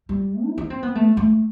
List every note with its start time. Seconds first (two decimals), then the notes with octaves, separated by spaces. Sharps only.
0.09 G3
0.45 E4
0.58 D#4
0.70 C4
0.83 B3
0.95 A3
1.17 A3